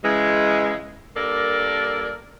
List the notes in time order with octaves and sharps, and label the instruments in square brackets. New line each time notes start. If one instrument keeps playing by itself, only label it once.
[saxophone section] C#3 E3 G#3
G2 A#3 A4 A#4 D5